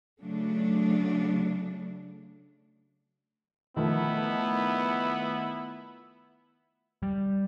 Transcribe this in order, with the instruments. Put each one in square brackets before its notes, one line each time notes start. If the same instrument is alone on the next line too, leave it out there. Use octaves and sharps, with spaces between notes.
[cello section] C#3 F#3 A3 D4
[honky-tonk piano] D#3 F3 A3 [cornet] B3 [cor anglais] E4
[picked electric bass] G3